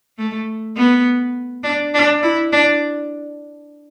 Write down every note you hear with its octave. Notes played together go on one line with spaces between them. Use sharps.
A3
B3
D4
D4
E4
D4